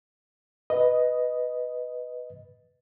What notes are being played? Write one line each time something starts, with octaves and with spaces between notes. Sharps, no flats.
B4 D#5